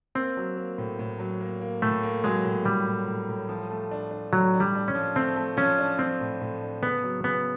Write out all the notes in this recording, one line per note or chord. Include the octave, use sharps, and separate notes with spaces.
A#3 C4
F#3
A#3
A2
A2
F#3
A#3
A#3
A2 A3
A#3
F#3 G#3
A2
A2 G3
A2
A2
A2
F3
A3
D4
D4
A2 F#3
D4
G3
D4
C#4
F3
A3 C4
A3
F3 C#4
D4
F3 C4
A2
A2
D4
C#3 B3
F#3
C#3 B3